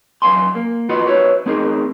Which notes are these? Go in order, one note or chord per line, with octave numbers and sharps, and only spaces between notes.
F#2 F3 F5 G#5 C6
A#3
F4 F#4 B4 D#5 F#5 B5
F#4 B4 C#5 E5
A3 C4 C#4 D#4 G#4 A#4